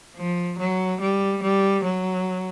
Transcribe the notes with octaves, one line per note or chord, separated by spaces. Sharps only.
F3
F#3
G3
G3
F#3